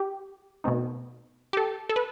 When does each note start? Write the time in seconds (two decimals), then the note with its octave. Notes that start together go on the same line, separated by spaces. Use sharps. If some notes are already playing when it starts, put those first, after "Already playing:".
Already playing: G4
0.64 B2 A3 C4 D#4
1.53 G4
1.57 A4
1.90 A4
1.96 B4